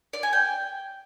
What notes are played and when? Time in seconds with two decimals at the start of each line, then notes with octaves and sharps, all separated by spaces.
0.13 D5
0.23 G#5
0.33 G5